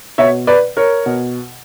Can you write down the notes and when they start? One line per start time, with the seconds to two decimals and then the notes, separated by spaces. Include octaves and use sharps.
0.18 B2 C#5 E5
0.47 B4 D5
0.77 A#4 C#5
1.06 B2